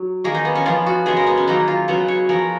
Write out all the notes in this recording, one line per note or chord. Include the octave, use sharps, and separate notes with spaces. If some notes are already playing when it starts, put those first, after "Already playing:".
Already playing: F#3
D#3 A#3 G#4
D#4
B3
C#4
F3 B3 F4
F#4
C#3 G#3 B3 G#4
A#4
B3
C#4
D#3 F#3 A#3 D#4
F4
C#3 F#3 B3 F#4
C#5
C#3 F3 B3 A#4